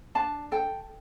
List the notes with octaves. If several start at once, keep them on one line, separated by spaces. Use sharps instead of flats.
D4 A5
A4 G5